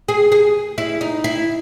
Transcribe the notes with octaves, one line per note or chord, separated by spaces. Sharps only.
G#4
G#4
E4
D#4
E4